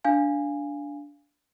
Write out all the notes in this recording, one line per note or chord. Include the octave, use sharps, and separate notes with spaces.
D4 F5 G#5